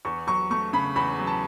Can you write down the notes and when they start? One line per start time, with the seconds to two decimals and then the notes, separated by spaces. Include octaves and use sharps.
0.05 E2 C#6
0.27 F#3 C#6
0.50 A3 C#6
0.73 C#3 B5
0.96 E2 B5
1.19 F#3
1.27 A5